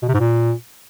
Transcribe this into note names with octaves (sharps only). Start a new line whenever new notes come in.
B2
C3
G#2
A#2